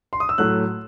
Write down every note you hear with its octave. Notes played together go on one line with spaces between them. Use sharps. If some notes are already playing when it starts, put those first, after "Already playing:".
C6
D#6
E6
A2 F#3 A3 F#6